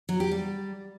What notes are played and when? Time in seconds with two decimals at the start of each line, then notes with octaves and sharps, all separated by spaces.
0.09 F#3
0.20 G4
0.32 G3